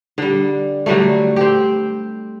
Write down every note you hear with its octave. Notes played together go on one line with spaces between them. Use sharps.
D3 G3
D3 F#3 G3 A3
C4 G4